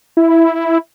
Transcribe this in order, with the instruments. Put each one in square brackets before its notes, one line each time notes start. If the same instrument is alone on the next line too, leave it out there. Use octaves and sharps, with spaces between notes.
[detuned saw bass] E4